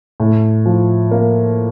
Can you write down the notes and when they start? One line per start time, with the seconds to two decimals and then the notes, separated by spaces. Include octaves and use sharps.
0.20 A2
0.66 F3
1.11 A#3